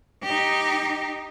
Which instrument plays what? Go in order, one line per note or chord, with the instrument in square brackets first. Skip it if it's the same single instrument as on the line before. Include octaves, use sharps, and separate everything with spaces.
[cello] D#4 G4